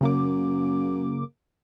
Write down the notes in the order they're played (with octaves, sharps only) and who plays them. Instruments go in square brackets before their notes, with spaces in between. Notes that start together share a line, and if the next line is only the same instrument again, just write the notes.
[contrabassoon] F#2 [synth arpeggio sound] C#3 A#3 D6